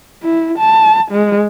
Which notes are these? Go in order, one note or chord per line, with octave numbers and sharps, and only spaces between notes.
E4
A5
G#3